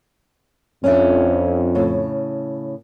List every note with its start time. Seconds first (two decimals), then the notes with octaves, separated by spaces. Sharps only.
0.84 F2 C#4 D4 E5
1.75 A2 C#3 A4